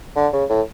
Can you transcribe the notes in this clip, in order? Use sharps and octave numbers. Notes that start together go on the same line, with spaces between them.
D3
C#3
A2